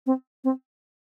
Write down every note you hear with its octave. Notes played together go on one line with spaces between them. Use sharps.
C4
C4